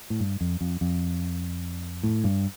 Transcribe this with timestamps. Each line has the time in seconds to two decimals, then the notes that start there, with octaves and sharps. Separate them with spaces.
0.10 A2
0.20 G2
0.41 F2
0.61 F2
0.81 F2
2.03 A2
2.24 G2